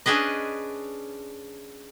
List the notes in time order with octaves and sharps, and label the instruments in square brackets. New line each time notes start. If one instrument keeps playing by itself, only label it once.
[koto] C#4 D4 G#4 B4 D#5